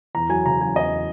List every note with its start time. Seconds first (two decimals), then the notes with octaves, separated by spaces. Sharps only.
0.15 E2 A#5
0.29 F#3 G#5
0.45 C#3 A#5
0.61 F#3 G#5
0.75 E2 D#5